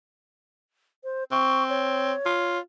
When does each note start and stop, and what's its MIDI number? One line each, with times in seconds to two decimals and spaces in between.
1.04 1.24 72
1.32 2.13 60
1.32 1.64 85
1.70 2.59 73
2.26 2.59 65